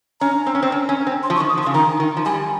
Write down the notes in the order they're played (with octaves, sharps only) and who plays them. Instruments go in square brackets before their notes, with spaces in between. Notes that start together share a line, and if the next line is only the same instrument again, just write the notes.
[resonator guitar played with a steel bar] C#4 [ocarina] A#5
[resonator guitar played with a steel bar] C4
C#4
C4
C#4
C#4
C4
[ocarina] C6
[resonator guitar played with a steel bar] F3
[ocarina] C#6
[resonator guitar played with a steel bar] D#3
[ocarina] D#6
[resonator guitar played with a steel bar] F3
[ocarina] C6
[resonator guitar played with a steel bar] C#3
[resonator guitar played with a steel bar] D#3 [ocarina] A#5
[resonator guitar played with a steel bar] D#3
F3
[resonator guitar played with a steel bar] G3 [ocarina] G#5